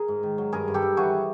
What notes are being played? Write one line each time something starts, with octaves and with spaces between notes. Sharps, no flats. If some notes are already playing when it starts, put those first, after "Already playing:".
Already playing: G#4 A#4
G#2
D#3
F#3
G2 G#4 A#4
G2
G4 A4
G2
E3 F#4 G#4